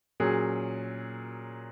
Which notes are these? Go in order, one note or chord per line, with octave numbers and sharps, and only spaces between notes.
A#2 F#3 C#4 G#4